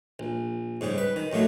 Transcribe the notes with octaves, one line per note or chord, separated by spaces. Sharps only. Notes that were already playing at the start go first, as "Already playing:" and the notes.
A#1
G#2 C#3 G3
B4
D#3
D#2 A2 F#3 A3 A#3